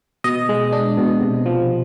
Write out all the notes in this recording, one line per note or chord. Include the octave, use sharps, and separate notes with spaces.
B2 D#5
G#3
D4
B2
C3
F3